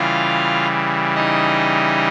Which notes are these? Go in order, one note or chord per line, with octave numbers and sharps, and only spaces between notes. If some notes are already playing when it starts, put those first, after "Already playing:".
Already playing: C#3 E3 G3 F4 F5
D#4 D#5